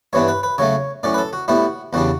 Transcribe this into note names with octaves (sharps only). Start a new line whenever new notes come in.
G2 E3 B3 D4 C#5
B4
B4
C#3 F#3 A3 C#5
A2 F#3 C#4 D5
B4
A4
F#4
A2 G3 B3 E4 F#4
E2 C#3 G3 D4 F#4